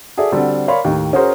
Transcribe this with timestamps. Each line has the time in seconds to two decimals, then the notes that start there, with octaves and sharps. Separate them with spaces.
0.17 F#4 G#4 A4 D5 E5
0.32 D3 G3 C4 F#4 A4 C5
0.68 A#4 C#5 D5 F5 B5 C6
0.84 D#2 A2 D#3
1.13 C#4 F#4 G#4 A#4 C5